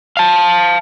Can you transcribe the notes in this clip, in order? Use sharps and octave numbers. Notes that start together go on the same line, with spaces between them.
F5 A5